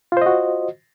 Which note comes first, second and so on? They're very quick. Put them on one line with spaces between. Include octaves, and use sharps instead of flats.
F4 C5 D#5 F#4